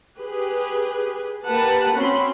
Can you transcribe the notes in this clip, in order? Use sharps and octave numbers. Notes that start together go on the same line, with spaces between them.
G4 G#4 B4
A#3 G4 B4 F#5 A5
C4 C#4 F#4 B5 C6